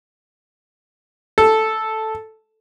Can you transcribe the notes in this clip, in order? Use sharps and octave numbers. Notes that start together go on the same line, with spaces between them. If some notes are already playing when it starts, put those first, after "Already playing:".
A4